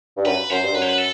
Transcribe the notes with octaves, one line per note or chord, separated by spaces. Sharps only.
G2
F#2 B4
F#2 C5
G2
F#2 B4
C5
B4
A4